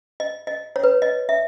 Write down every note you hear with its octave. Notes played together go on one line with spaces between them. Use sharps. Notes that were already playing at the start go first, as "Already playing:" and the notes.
D#5
D#5
C#5
B4
D#5
E5